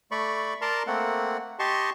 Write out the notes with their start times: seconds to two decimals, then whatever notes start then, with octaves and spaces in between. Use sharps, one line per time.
0.11 A3 D5 B5 C#6
0.62 A#4 D5 A5 A#5 C6
0.87 A3 A#3 C4 F#5
1.59 G4 D#5 A5 C6 C#6